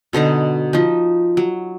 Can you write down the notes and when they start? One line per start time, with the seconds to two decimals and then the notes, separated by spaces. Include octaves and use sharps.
0.13 B2 D3 D#4 A#5
0.73 F3 D#4
1.37 F#3